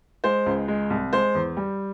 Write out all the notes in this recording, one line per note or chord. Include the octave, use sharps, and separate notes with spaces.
G#3 C5
C#2
G#3
C2
G#3 C5
E2
G3